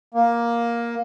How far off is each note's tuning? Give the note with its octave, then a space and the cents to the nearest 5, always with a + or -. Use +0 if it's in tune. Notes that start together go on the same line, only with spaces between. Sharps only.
A#3 +10